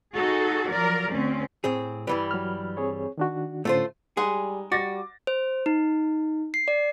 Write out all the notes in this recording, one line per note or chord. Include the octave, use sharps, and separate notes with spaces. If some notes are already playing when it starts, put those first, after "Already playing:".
D#4 F#4 G#4 A4
F3 F#3 A#4 D5
D2 C4 C#4
A2 C4 G#4
G2 E3 G3 B4
F#3 F6
C4 G#4 C#5
D#3 D4 F#4
A2 D3 A3 C#4 F4 C5
G3 G#3 D#4 G#4 F#5
G3 F#4 D6 A6 A#6
C5
D#4
C7
D5